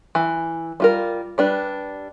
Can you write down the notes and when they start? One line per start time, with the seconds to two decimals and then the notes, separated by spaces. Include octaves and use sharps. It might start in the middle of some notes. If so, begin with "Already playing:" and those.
0.15 E3
0.80 G3 F4 A#4
1.38 G3 D4 B4